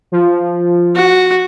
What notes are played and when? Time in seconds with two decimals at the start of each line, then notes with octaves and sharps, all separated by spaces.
0.12 F3
0.96 F#4